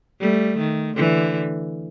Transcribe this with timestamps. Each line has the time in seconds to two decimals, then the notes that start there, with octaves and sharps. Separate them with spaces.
0.21 G3 A3
0.58 D#3
0.96 D3 E3